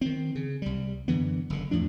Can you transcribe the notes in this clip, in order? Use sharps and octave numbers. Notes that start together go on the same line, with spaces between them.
D#3 C4
C#3
C2 G3
F#2 D3 E3 B3
F#1 D3
E2 A2 F3 D4